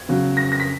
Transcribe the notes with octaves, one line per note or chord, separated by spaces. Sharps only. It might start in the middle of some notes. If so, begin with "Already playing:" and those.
Already playing: G#6
C#3 F#3
A#6
A#6
B6